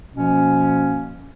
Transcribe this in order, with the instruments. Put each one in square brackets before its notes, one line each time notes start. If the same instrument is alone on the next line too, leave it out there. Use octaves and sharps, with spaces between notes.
[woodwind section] B2 F3 A#3 C#4